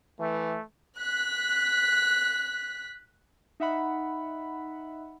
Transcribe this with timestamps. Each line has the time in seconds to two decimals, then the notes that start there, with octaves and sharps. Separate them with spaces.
0.20 E3 A3
0.98 F#6 B6
3.60 D#4 E5 F#5 B5